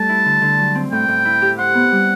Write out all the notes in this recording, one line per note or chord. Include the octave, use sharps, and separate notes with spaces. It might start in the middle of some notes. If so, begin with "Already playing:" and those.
Already playing: G3 A3 A4 A5
E4
D3
D3
F#3
C4
A2 G5
A2
E4
G4
C5 F#5
B3
G3